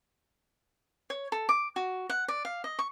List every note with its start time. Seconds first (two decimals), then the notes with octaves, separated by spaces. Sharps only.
1.10 C#5
1.32 A4
1.49 D6
1.76 F#4
2.09 F#5
2.28 D5
2.45 F5
2.64 D#5
2.79 C#6